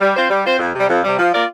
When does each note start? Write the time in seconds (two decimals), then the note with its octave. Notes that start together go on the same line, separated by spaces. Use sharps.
0.01 G3
0.16 C4 F4 C5
0.30 G3
0.45 C4 F4 C5
0.59 F2
0.74 C3 G3
0.89 F2
1.04 C3 G3
1.19 F3
1.33 A#3 F4 A#4 D5